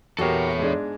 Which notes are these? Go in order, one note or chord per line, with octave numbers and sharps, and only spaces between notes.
E2 F#4 G4 A4 A#4 C#5
G#2 G#3 D4